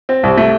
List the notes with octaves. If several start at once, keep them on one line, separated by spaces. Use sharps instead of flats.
C4
C2
A3